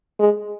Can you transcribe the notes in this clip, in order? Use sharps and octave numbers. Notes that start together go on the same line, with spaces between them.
G#3